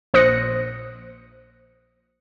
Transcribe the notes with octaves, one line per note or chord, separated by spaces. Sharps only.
A#1 C5 D#6 F#6 A#6 C#7